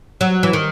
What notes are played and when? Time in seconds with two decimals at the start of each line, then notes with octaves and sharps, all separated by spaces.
0.21 F#3
0.43 E3
0.53 D#3